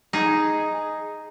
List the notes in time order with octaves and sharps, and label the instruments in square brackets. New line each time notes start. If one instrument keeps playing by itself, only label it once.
[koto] D#4 G#4